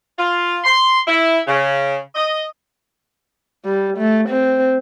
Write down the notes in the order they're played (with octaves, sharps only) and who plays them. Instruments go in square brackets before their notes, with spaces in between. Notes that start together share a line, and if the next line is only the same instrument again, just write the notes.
[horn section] F4
C6
E4
C#3
D#5
[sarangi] G3
A3
C4